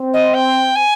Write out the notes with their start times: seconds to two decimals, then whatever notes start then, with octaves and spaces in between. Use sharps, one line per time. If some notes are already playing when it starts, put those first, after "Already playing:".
Already playing: C4
0.13 D#5
0.34 G5
0.75 G#5